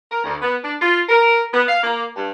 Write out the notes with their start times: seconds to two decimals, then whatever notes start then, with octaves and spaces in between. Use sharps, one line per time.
0.11 A#4
0.23 D2
0.42 B3
0.63 D4
0.81 F4
1.09 A#4
1.53 B3
1.68 F5
1.83 A#3
2.16 G2